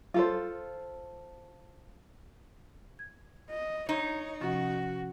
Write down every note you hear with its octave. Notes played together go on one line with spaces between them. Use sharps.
F4 A4 C5
G#6
D#5
D#4 C#5
C3 F3 C#4 F#4